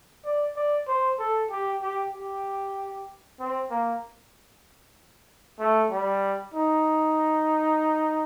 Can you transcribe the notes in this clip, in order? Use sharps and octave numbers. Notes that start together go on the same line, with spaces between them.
D5
D5
C5
A4
G4
G4
G4
C4
A#3
A3
G3
D#4